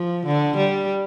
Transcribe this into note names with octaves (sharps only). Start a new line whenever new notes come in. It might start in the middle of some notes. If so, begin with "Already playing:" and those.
Already playing: F3
D3
G3